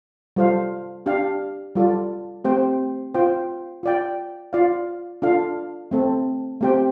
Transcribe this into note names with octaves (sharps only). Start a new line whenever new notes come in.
G3 F4 A4 C5 F5
D4 G4 F5
G3 F4 A4 D5
A3 C4 G4 C5 G5
F4 C5 G5
F4 D5 G5
F4 D5 F5
D4 F4 A4 F5
A3 C4 A4
A3 C4 G4 C5 G5